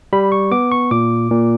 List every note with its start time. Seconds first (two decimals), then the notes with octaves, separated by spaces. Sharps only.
0.13 G3 B5
0.32 C#6
0.51 B3 D6
0.72 C#6
0.91 A#2 D6
1.31 A#2